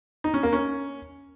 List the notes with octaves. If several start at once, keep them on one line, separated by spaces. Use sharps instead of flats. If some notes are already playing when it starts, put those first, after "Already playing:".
D#4
C#4
A#3
C#4